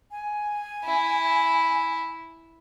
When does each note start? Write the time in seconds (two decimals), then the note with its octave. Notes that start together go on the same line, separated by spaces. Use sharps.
0.11 G#5
0.85 E4